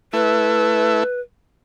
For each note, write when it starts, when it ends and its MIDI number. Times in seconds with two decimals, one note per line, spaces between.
0.13 1.03 57
0.13 1.03 64
0.13 1.20 71